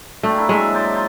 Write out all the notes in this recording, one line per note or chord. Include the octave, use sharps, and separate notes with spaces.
A3 D4 G5
A#3 E4
F#3 G#3 E5
C5 D5
F4 C5 D#5